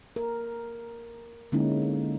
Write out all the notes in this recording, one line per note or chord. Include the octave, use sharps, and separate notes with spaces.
A#4
D3 G#3 A#3 C#4 D#4 E4